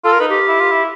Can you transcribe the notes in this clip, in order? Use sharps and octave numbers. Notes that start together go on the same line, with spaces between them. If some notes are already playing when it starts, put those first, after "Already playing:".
F4 A4
A#4
D#4 B4
G4
E4
F4
E4